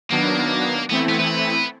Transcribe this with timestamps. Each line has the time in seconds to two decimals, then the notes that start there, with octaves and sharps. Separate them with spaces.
0.11 D#3 F#3 A#3 B3 D4
0.90 E3 A3 B3 C4 E4
1.09 B3
1.19 B3